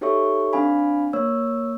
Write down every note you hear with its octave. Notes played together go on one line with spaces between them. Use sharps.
D#4 G4 A4 C#5 E5 C#6
C4 D4 F5 G#5 B5
A#3 C#5 E6